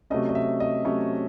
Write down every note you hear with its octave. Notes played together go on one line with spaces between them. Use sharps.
C3 F#3 A3 C#4 D#5
D#5
E5
D#5
C3 F#3 A3 C#4 C#5